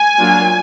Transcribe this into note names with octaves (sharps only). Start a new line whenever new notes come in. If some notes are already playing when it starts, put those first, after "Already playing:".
Already playing: G#5
F#3 A#3 D4 F4